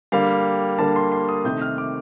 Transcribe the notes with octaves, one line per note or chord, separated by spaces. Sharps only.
D3 G3 A#3 F5
D3 G3 A#3 A5
C6
C6
D#6
C3 D#3 A3 G6
F6
D6